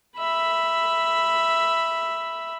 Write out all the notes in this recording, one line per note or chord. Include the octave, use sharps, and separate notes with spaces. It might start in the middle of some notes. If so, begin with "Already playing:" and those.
E5 B5